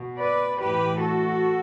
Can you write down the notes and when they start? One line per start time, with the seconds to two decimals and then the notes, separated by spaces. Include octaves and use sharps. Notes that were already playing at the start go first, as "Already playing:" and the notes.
Already playing: B2
0.19 B4 D5
0.60 A2 E3 G4 B4
0.99 F#4 A4